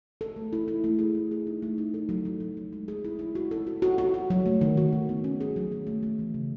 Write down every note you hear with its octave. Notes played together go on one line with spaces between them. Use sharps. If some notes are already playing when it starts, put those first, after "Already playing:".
A4
A3
E4
E4
A3
G#4
A3
G#4
D#4
A3
D#4
A4
F#3
F#3
F#3
F#3
G#3
G#4
E4
E4
F#4
A4
F#4
F#4
F#4
F#4
F#3
A3
D#3
F#4
D#3
B3
C#4
G#4
F#3
G#4
A3
A3
E3
C#3